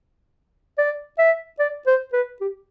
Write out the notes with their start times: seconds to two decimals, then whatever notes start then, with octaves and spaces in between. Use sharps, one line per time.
0.78 D5
1.18 E5
1.59 D5
1.86 C5
2.13 B4
2.41 G4